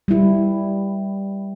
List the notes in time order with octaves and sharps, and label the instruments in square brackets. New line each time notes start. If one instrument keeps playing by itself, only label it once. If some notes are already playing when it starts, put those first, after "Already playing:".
[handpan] G3 E4